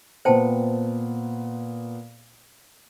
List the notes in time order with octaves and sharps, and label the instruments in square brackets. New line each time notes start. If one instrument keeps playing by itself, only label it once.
[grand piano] A#2 B3 [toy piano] C5 G5 A5